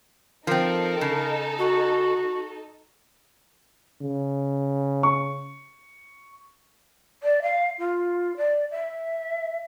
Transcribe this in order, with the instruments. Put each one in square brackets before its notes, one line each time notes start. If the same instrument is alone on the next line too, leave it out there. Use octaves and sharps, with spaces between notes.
[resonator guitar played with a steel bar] F3 C4 [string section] D#4 A4 [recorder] A#4
[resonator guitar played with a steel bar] C#3
[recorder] F#4
[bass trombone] C#3
[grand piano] C#6
[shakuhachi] D5
F5
F4
D5
E5